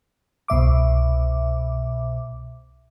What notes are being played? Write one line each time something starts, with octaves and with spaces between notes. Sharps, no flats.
C2 B2 E5 D6